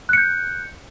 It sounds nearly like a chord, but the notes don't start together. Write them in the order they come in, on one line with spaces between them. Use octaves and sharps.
F#6 C#7 G6